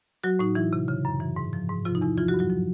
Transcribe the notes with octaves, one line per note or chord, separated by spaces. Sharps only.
F#3 F#4
A2 D#4
E3 E4
C3
C#3
F#2
E3
G#2
F3
G#2
C3 F3 F4
D#4
E2 E4
E3 F3 F4
F#3 F#4
G2
F#3 F#4
F3